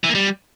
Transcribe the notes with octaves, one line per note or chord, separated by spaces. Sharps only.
E3
A#3
G3